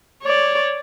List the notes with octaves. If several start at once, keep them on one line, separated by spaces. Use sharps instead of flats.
C#5 D5